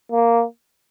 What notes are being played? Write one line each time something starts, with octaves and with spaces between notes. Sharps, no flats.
A#3